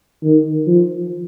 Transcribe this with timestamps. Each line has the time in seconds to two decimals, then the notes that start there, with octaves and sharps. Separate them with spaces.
0.23 D#3
0.67 F3